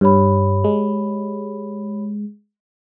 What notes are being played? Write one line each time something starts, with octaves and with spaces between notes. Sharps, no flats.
G2 G4 C#5 B5
G#3